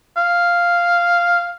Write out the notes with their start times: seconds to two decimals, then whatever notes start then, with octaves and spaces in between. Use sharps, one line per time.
0.17 F5